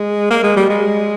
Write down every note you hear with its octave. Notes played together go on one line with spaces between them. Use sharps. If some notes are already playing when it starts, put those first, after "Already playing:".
Already playing: G#3
A#3
G#3
G3
G#3